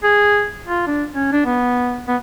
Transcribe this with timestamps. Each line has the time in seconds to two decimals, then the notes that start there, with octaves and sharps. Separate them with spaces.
0.03 G#4
0.67 F4
0.87 D4
1.14 C#4
1.32 D4
1.45 B3
2.08 B3